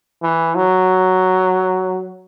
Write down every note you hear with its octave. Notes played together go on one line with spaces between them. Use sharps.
E3
F#3